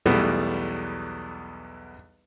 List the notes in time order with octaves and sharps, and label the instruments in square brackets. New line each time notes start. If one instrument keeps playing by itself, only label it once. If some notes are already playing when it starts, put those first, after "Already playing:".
[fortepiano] B1 E2 E3 G3 A3 B3